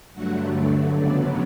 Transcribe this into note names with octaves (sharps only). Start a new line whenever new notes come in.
G2 D3 F#3 A3 F#4 F#5
D4 D5
F2 C#3 F#3 B3 D4 D5